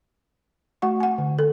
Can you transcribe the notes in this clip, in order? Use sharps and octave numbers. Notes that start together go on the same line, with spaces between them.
A3 F#4 F#5 C#6
F#5 G#5
D3
A4